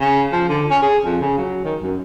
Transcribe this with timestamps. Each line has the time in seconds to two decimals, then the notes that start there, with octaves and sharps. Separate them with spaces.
0.01 C#3
0.33 F3
0.49 D3
0.70 C#4
0.82 G#4
1.05 F2
1.21 C#3
1.38 F#3
1.64 D#3
1.82 F#2